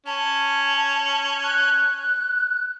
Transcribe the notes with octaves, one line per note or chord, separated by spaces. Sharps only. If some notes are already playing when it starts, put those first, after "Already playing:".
C#4 A5
F#6